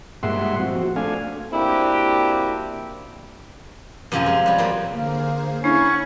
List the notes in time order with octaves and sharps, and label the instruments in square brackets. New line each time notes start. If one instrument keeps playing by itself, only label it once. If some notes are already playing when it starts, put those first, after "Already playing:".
[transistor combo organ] G2 A#2 G#3 E5 F#5 C6
F3 C4 F#4
A3 D4 F5 G#5
[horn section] A#3 C4 D4 E4 F#4 G4
[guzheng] F#2 C3 F3 F4 G#5 A#5
G#3
F#3 G3
F3 A#3 C4
[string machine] D3 G#4 C5 [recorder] A#3
[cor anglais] C#4 [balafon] D4 [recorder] E4 [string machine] F#5 C#6